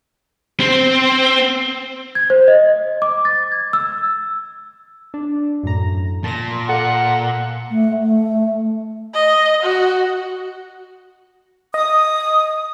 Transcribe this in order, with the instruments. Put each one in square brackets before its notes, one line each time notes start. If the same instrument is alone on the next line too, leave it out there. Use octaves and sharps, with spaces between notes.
[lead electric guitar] C4
[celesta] G#6
C5
D#5
D6
A6
G#6
E6
[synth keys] D4
F#2 A2 A#5
[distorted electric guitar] A#2 [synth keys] A5 A#6
[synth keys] A4 F5 [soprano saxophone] F#5
[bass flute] A3
A3
[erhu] D#5
F#4
[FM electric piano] D#5 [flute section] D#6